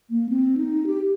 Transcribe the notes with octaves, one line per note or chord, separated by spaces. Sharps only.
A#3
C4
D#4
G4